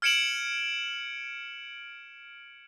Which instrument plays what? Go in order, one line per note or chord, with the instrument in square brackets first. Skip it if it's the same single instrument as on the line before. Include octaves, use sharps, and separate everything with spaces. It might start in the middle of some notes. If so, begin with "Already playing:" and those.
[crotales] F6 G#6 C#7 D7 E7 F#7